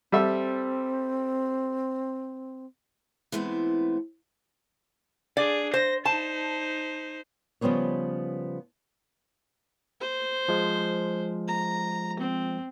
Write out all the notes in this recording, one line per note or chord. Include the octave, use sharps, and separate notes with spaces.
G3 C4 A4 E5
E3 G#3 A3 B3 C4
D4 G#4 D5
C5 A#6
D#4 C5 A5
C#3 F3 G3 B3 C5 C#5
C5
F3 G#3
A#5
C4